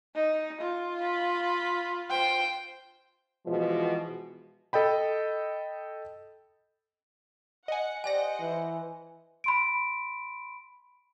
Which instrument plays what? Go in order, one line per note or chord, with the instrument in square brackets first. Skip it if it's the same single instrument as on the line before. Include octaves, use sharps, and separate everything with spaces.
[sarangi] D#4
F4
[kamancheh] B5
C5 G5
[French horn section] B2 E3 F3 G#3
[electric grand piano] A4 D#5 G5 B5
[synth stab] D#5 G#5 [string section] F#5
[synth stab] G4 D5 A#6 [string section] C5 D#5 F#5 [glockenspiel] G#5
[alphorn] E3
[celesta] B5 C6 D7